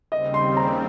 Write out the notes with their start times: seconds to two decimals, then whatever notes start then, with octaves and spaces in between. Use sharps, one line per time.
0.11 D#2 C#3 G3 C4 D#5
0.34 C6
0.57 A#5